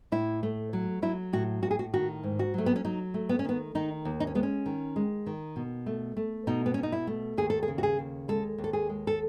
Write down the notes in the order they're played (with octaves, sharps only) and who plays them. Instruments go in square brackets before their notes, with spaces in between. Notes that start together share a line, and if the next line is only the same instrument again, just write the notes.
[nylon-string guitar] A2 E4
A3
F#3
F#3 E4
A2 F#4
A2 F#4
G#4
F#4
D#3 F#4
G#2
F#4
F#3 A3
B3
C#4
F#3 D#4
A3
B3
C#4
D#3 B3
D#3 D#4
D#2
D#4
C#4
G#3 B3
C#4
D#3
G#3
D#3
B2
A3
A3
B2 D#4
B3
B2 C#4
D#4
E4
A3
D#2 G#4
A4
G#4
C#3
F#4
G#4
D#2
G#3 A4
D#2
A4
G#4
G#3
A4